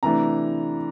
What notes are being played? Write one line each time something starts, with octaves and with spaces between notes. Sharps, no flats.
C3 E3 A3 D4 A#5